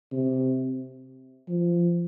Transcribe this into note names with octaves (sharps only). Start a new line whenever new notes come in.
C3
F3